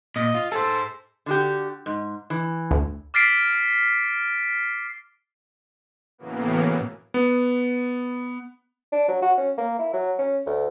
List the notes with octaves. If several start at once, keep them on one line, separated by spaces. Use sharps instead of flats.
A#2 D#5
F4
G#4 A4 C5
D3 F#4 G4
G#2
E3
D2
D6 F6 A6 B6 C7 D7
A2 C#3 E3 F#3 A#3 B3
B3
D4
F#3
F#4
C#4
A#3
E4
F#3
C#4
D2